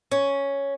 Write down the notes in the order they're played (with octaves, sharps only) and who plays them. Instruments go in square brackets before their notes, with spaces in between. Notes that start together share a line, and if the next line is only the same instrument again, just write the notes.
[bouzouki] C#4